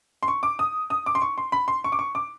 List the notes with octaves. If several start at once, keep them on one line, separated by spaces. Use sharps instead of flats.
C6
C#6
D6
D#6
D#6
D6
C6
C#6
C6
B5
C6
C#6
D6
C#6
D6